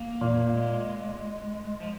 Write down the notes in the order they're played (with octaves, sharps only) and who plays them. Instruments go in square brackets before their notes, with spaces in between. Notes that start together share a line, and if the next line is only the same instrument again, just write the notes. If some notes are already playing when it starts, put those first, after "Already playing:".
Already playing: [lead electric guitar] A#3
[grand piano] A#2
[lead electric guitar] G#3
F3